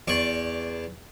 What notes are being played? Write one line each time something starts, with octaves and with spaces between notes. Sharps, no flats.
E2 D5 C#6